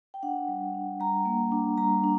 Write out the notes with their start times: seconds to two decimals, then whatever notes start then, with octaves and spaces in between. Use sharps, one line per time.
0.14 G5
0.23 D4 F#5
0.48 G3
0.74 D4
1.00 G3 A#5
1.26 A#3
1.52 D4
1.78 G3 A#5
2.04 D4